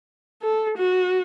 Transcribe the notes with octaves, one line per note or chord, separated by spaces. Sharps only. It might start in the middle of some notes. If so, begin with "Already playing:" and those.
A4
F#4